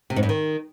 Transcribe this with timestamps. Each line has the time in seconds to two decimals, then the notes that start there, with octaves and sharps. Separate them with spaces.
0.10 C3
0.16 G#2
0.23 G2
0.29 D#3